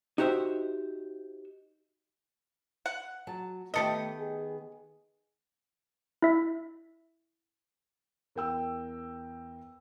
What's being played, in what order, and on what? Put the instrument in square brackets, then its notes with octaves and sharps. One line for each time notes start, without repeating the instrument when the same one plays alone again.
[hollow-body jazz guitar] D#4 F#4 G4 C5 E5
[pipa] F#5
[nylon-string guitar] F#3 A5
[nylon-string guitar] D#3 B3 [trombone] A3 [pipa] G4 A4 D#5
[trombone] G#4
[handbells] E4 E5
[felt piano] E2 A#4 G5 E6